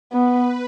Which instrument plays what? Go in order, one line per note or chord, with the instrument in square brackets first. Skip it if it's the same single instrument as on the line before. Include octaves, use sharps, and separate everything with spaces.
[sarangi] B3 [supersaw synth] B4